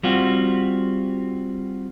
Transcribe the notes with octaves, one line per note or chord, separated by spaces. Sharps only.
G3 C4 F4 F#4